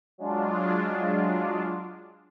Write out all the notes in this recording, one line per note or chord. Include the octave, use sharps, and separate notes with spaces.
F#3 G#3 D4 F4